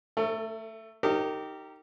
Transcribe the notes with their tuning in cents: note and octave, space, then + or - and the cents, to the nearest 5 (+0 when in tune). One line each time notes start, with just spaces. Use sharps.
A3 +15 A4 +45
D#4 +0 G4 -15 A#4 -35